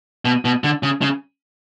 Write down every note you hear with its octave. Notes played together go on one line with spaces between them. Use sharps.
B2
B2
D3
C#3
C#3